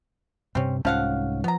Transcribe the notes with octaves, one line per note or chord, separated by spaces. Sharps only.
G2 C3 C4 C#4
C2 G#2 F3 C#4 F5 F#5
F3 B3 A#5